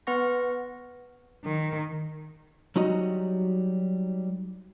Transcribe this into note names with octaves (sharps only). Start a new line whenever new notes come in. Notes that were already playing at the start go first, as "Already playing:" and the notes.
B3 B4 F#5 C#6 A#6
D#3
F#3 G3 D#4 F#4 D#5 A#5